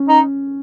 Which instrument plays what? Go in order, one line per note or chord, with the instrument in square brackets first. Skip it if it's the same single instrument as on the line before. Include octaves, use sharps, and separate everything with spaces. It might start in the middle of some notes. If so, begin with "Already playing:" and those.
Already playing: [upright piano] C#4
[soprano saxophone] D#4